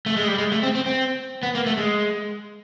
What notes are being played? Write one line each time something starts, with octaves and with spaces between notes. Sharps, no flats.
A3
G#3
G3
G#3
A3
C4
C4
C4
B3
A#3
A3
G#3